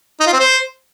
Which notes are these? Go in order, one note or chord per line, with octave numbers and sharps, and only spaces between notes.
D#4
F4
C4
C5